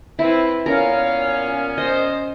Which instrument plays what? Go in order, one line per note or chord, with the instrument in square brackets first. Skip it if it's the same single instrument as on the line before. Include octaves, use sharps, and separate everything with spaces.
[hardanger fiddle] C4 B4 [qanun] E4
[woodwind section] A#2 B3 C#4 [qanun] A#4 [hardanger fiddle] C#5 F5
[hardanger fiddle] C5 [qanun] D#5